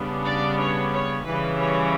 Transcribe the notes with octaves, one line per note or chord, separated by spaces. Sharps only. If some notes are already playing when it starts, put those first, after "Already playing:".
Already playing: C#3 G3 B3 D4
D5
C#5
C#5
C#3 E3 G3 B4
C#5